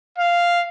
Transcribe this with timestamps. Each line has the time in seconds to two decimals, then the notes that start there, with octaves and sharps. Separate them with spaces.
0.18 F5